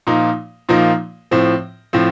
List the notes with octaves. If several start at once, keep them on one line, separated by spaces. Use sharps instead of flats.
A#2 F3 A#3 D#4
A#2 F3 A#3 D#4
A2 F3 C4
A2 F3 C4